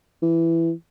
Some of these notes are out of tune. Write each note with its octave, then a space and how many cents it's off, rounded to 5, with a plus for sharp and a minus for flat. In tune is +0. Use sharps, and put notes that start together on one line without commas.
E3 +10